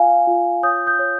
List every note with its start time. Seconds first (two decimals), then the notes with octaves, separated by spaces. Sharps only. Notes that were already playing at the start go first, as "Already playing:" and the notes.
Already playing: F4 F5 G#5
0.27 F4
0.63 C#5 D#6 G6
0.87 D#6 G6
0.99 C#5